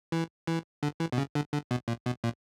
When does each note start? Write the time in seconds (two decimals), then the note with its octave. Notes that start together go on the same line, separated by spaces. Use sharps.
0.12 E3
0.47 E3
0.83 D3
1.00 E3
1.12 B2
1.18 C#3
1.35 D3
1.53 D3
1.71 B2
1.88 A#2
2.06 B2
2.24 A#2